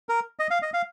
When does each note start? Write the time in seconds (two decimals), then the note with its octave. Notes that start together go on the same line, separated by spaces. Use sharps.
0.09 A#4
0.39 D#5
0.51 F5
0.62 D#5
0.74 F5